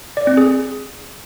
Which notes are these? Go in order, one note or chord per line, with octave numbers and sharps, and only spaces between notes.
D5
C4
G#4